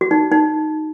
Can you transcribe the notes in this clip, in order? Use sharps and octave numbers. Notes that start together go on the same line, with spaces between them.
F#4
D#4
D#4